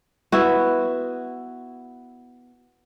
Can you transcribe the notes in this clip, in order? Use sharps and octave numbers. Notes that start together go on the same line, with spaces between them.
B3 E4 F#4